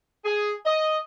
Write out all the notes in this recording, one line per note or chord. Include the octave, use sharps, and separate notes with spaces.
G#4
D#5